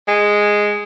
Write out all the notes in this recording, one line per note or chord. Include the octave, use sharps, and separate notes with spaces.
G#3